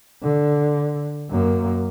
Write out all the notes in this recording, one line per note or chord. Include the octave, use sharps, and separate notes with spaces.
D3
F#2 A#3